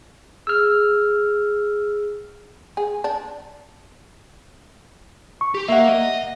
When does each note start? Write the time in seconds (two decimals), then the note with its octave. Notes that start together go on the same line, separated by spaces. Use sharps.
0.47 G#4 E6 F6
2.77 G#4
3.04 D4
5.41 C#6
5.54 G4
5.69 A#3 E5 F#5
5.89 D#5